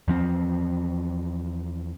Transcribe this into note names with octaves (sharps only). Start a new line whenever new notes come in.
E2 F3 C4